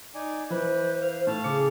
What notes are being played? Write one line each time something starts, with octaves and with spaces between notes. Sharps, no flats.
D#4 D5 G#5
E3 B4 C5
F5
A2 F5 A5
C#3 D6 C#7